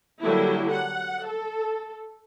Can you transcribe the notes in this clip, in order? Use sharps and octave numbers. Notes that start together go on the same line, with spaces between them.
D3 F#3 G3 A#3 E4
F#5
A4